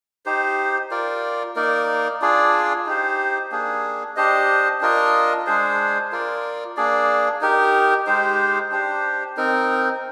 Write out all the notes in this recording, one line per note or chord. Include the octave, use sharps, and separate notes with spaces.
D#4 G4 C5
F4 A#4 D5
A#3 D#4 A#4 D5
D4 F4 G#4 D5
D#4 G4 C5
A#3 D4 G#4
D4 G4 C5 D#5
D4 F4 A#4 D#5
G#3 D4 G#4 C5
F4 A#4 D5
A#3 D4 G#4 D5
D#4 G4 A#4
G#3 D#4 G4 C5
D4 G4 C5
C4 D#4 A#4